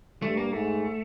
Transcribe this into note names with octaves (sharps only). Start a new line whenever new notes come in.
G2 A3
A#3
G#2 A3